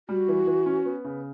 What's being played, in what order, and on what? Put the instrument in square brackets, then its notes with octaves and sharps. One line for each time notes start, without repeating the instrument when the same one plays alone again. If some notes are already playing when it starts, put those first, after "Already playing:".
[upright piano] G3 [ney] F#4
[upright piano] E3
E3
C#4
B3
C#3